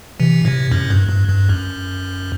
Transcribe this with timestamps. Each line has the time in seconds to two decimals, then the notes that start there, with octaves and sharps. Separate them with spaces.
0.20 C3 E3
0.45 A2 C3
0.72 F#2 A2
0.90 G2
1.09 G2
1.29 G2
1.49 F#2